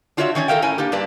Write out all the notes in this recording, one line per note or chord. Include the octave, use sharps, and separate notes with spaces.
D4 F4 F#4 C#5 D5 E5
D#3 C#4 C#5 D5
A4 A#4 E5 F5 G5
A2 C#4 A#4 G#5
A#3 D4 G4
G2 A#3 D4 B4 D5 A5